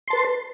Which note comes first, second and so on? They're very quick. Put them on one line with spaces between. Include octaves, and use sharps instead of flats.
C6 A5 B4